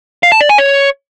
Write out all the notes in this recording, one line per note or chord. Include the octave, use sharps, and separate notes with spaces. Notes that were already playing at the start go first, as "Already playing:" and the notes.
F5
A5
D5
G#5
C#5